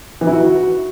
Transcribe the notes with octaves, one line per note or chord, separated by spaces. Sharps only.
E3
E4
F#4